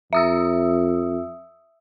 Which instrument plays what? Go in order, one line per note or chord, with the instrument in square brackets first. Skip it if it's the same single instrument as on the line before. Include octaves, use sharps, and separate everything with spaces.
[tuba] F2 [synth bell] E5 D#6 E6